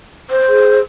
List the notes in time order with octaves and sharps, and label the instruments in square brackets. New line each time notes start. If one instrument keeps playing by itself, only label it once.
[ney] C5
[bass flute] G#4